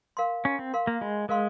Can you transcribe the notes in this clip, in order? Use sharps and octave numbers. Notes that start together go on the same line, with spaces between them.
A#4 F5 C6
C#4 F4
C4
A#4 F5 C6
A#3
G#3 F4
G#3 A#4 F5 C6